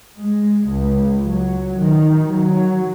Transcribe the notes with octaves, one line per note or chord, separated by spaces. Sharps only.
G#3
C#2
F#3
D#3
F#3